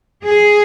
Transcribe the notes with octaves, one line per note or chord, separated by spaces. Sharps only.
G#4